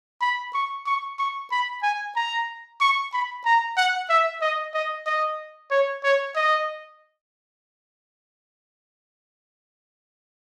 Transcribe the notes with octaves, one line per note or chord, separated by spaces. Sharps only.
B5
C#6
C#6
C#6
B5
G#5
A#5
C#6
B5
A#5
F#5
E5
D#5
D#5
D#5
C#5
C#5
D#5